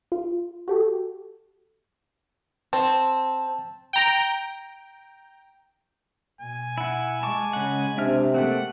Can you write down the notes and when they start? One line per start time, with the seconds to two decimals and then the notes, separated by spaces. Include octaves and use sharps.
0.12 F4
0.68 F#4 G4 A4
2.73 C4 A5
3.93 G5 A#5
6.41 B2 G#5
6.78 E4 F#5
7.23 G#3 A5 C#6 D6
7.53 C#3 F#5
7.98 C3 D4 E5 F6
8.34 A3 A#3 C4 F#5